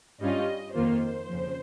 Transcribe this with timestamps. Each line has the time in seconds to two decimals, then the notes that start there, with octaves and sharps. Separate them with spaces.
0.21 G2 G3 C#4 F4 D#5
0.75 F2 D#3 A#3 F4 C5
1.27 F2 C#3 F3